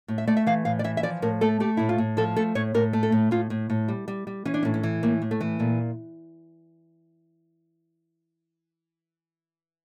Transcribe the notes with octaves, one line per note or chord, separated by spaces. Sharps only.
A2
E5
A3 D5
E5
E3 F5
A2 F5
D5
E3 E5
E5
F3 D5
A2 A#4
A3 A4
A3 G4
A2 E4
F4
A2
F3 A4
A3 A4
A2 C#5
A2 A#4
A3
A4
A2
A2 F4
A2
A2
G3
G3
G3
E3 C#4
D4
A2 C#4
C#4
E3
A2 A#3
A2
A3
E3
A#2 A3